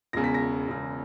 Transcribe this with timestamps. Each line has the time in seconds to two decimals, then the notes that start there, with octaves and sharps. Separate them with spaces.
0.13 E1 E2 C#3 A#6
0.24 B6
0.34 A#6
0.68 E1 E2 C#3